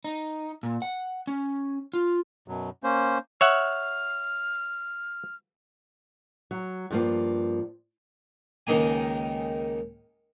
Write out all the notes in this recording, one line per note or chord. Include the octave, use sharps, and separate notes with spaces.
D#4
A#2
F#5
C#4
F4
F#2 B2 F#3
A#3 C#4 C5
C#5 E5 F#5 F6
F#3
G2 F3 A#3
C#2 D#3 G#3 A#3 G#5